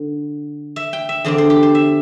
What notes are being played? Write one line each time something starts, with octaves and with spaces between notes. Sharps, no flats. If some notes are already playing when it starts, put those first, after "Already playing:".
Already playing: D3
E5
G5
E5
E2 D3 C4 D5
C5
G4
C5
E5